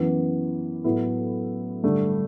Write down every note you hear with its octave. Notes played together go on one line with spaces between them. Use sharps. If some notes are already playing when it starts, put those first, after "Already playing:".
Already playing: F#2 E3 B3
A2 F#3 B3 E4
G2 D3 A3 D4